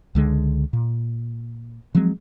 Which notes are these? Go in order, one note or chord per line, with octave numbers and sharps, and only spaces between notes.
C#2 D3 G#3
A#2
F3 F#3 G#3 C4